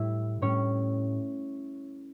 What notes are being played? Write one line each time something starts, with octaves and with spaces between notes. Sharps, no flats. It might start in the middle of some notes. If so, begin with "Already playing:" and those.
Already playing: A2 G3 E4 E5
A2 G3 C#4 C#5